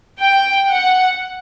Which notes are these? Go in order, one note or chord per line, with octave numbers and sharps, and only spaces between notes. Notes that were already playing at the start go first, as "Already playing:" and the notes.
G5
F#5